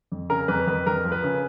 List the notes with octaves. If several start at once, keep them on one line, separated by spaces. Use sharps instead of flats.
F2
C#3 A#4
F2 B4
F2 B4
F2 A#4
F3
B4
C#3